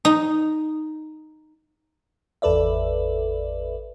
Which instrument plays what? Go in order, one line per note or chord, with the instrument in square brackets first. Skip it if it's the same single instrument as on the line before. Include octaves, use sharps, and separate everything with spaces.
[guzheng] D#4
[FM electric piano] G#1 E2 A4 B4 D5 E5